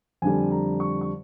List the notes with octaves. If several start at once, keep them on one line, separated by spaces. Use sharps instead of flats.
F2 D3 G3 G#5
A#5
C#6
C#6